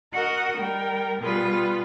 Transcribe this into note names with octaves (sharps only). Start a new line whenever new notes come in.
F#4 A#4 D#5 F#5
G3 A#4 G5
B2 G3 F4 G#4 B4